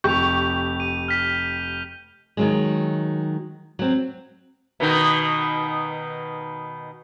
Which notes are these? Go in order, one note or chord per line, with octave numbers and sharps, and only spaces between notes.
F1 G4 C#6 G6 F7
D#7
F6 B6
D#3 F#3 G#3
F#3 C4
B2 D#3 D#4